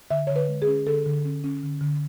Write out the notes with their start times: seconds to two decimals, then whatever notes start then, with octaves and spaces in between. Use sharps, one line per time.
0.10 D3 E5
0.27 D3 C#5
0.36 B4
0.48 G#3
0.62 G#4
0.67 C#4
0.87 D3 A4
1.06 D3
1.25 C#4
1.44 C#4
1.63 D3
1.81 D3